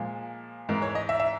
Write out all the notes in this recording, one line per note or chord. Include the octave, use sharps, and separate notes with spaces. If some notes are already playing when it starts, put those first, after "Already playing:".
Already playing: A#2 F3 G#3
G#2 E3 G#3 A#4
C#5
D#5
E5
E5